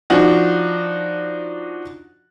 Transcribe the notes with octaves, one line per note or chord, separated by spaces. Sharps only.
F3 D4 D#4 F#4